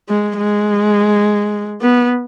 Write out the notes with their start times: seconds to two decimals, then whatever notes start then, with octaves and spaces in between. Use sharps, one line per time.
0.09 G#3
0.38 G#3
1.82 B3